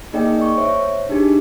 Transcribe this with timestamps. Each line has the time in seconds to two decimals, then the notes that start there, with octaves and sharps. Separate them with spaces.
0.13 A#3 D#4 G#4 D5 D#5 G5
0.42 C#6
0.57 C5 C#5 E5
1.09 D4 D#4 G4 G#4